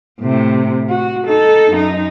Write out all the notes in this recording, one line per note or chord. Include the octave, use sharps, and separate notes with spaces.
A2 C3
F#4
D#4 A4
F#2 D#4